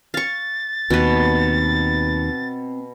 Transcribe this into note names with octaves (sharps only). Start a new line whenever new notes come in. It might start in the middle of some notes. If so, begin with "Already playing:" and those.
F5 C#6 A6
D#2 B2 C4 B4